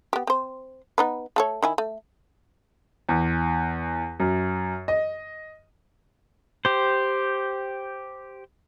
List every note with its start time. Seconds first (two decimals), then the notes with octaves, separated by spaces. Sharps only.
0.13 B3 G4
0.27 C4 C5
0.98 B3 D#4 B4
1.36 A3 A4 C#5
1.63 D#3 E4 G#5
1.78 A3
3.09 E2
4.20 F#2
4.88 D#5
6.65 G4 C5